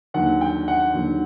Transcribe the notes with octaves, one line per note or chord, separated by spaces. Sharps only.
D#2 D3 F#3 F#5
G5
F#5
D#2 D3 F#3